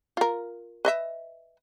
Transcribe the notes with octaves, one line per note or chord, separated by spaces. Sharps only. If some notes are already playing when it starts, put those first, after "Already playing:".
F4 A#4
B4 D#5 E5